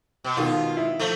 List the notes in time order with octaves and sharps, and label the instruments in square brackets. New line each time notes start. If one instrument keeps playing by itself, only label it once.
[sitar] B2
[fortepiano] B2 D#3 [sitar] F4
[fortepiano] E4
[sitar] F3 A3